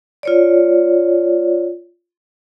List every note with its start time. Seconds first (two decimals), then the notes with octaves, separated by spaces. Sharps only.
0.23 F4 C#5 D5